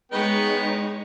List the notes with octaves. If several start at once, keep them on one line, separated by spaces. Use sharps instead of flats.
G#3 B3 D#4 B4 C#5 G5